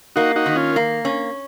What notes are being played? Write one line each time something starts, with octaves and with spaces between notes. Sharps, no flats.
A#3 D#4 F#4
D#4 F#4
D#3
C#4 F4
A#3
C#4